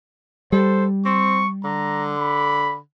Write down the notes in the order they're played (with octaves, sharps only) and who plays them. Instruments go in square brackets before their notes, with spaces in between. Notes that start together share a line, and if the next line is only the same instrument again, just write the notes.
[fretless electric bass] G3 [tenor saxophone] A4 [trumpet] C5
[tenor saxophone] C4 [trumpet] C#6
[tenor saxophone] D3 [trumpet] A#5
[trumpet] B5